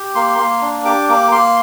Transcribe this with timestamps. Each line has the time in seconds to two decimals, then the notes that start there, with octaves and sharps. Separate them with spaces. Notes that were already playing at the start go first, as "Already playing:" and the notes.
Already playing: G4
0.15 A#3 C6
0.39 A#3 C6
0.61 D4
0.85 G4 D6
1.09 A#3 D6
1.32 A#3 C6